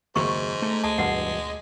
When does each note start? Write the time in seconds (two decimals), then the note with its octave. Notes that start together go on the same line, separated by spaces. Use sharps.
0.16 F#1 D#2 G#2 C#6
0.62 A3
0.84 D2 G#3 A5
0.98 E1 G2 F#5